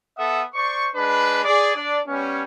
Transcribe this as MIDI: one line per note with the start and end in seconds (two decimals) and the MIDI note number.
0.18 0.43 59
0.18 0.43 69
0.18 0.43 76
0.18 0.43 78
0.18 0.43 87
0.54 0.88 72
0.54 0.88 74
0.54 0.88 85
0.95 1.43 56
0.95 1.43 62
0.95 1.43 71
0.95 1.43 83
1.45 1.73 68
1.45 1.73 74
1.75 1.99 62
1.75 1.99 74
2.07 2.43 55
2.07 2.43 59
2.07 2.43 61